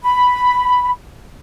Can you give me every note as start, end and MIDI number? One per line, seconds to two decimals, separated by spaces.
0.03 0.90 83